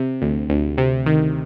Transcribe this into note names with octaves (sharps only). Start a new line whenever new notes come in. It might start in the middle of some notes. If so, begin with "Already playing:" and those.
Already playing: C3
D2
D2
C3
D#3